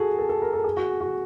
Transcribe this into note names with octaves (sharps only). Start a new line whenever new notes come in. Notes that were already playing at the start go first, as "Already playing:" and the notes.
Already playing: F#4 G#4 A4
A4
A4
A#4
A4
G#4
F#4
F#4